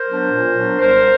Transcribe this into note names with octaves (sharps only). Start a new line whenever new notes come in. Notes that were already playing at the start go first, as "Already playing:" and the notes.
Already playing: A#4 C5
F#3 B3 D4
A#2
F#3 B3 D4
C2 A#4 C5